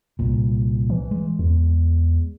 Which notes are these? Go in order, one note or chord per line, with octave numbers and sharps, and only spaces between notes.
C2 A#2
E3
G#3
E2